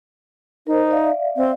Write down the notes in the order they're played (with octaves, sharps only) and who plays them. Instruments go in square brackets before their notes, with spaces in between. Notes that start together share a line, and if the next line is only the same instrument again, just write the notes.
[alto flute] D#4 [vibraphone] A#4 C5
[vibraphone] D5 E5 F5
[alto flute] C4